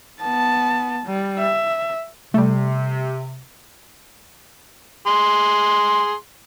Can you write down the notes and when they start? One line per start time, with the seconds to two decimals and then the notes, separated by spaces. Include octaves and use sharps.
0.22 B3 A5
1.07 G3
1.39 E5
2.34 C3 G3 A3
5.07 G#4 C6